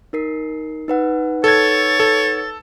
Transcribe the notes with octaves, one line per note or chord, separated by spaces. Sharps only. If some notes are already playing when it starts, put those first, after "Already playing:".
D#4 A#4 C7
D#4 B4 F#5
A4 C#5 G#6 A6
A4